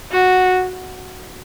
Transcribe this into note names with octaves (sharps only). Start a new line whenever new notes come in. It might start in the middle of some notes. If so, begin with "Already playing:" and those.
F#4